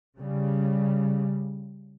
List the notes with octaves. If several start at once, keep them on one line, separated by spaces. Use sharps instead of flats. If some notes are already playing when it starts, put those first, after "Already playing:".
C#3 G3